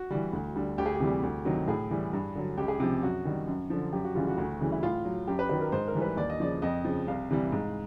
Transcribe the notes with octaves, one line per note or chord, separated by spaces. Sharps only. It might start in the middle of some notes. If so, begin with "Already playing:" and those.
Already playing: F#4
E3 G3
D2
D3 G3
D2 G4
G#4
G4
C3 E3 G3
D2
C3 D#3 F#3
A2 G#4
E3 G3
G2
D3 F#3
C#2 G4
G#4
C3 F3 G4
F#2 F#4
D#3 G3
F#2
D3 F3
F#2 G4
F#4
C#3 E3 G3 F4
F#4
D2
C#3 E3 G3
E4
A2 F4
F#3
F#2 G4
B4
D#3 F#3 B4
A#4
G#2 C5
A#4
E3 G3
B4
D#2 D5
D#5
C#3 F3 D5
F2 D#5
C#3 F3
C2 F5
C3 E3 G3
G#2